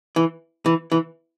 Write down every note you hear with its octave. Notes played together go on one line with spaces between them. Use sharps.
E3
E3
E3